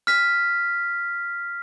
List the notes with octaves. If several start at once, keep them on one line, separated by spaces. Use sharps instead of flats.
F6 B6